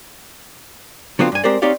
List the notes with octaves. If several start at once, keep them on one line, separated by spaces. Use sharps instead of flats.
D3 F#3 B3 C4 F4
G2 G#5
G#3 C4 G4 A#4 C5 D5
C4 D#4 G4 C#5 D5 F5